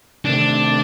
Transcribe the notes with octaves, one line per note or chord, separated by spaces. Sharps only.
C3 D#3 A3 C4 D4